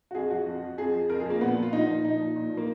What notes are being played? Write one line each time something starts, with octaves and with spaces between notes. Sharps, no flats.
F#4
F2 G#4
F3 F#4
F2
F3
F2 G#4
F3
F2 A#4
G#4
F3
A#3
A#2 B3
F3
F4
A#2 D#4
F3
A#2 D#4
F3
A#2
F3
A#3